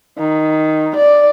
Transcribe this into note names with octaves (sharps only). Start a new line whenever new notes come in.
D#3
D5